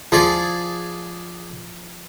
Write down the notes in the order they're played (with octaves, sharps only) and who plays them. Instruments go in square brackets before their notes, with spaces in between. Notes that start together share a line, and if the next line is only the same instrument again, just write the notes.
[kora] F3 [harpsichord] G#4 D5 G#5